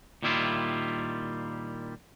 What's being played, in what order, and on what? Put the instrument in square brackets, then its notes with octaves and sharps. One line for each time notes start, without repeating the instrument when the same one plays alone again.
[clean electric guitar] A#2 D#3 G3 E4 F4